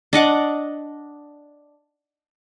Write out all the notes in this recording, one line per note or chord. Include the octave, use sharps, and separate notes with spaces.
D4 D#5 F#5 D6